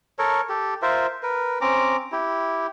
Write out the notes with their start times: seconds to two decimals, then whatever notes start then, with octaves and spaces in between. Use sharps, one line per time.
0.19 A4 A#4 C#5
0.49 G4 A4
0.82 F4 A#4 C5 E5
1.23 A#4 B4
1.61 C4 C#4 A#5 D6
2.12 E4 G4